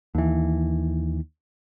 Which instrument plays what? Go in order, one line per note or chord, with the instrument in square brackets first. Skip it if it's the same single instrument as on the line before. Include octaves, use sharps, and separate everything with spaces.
[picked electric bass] D#2 E3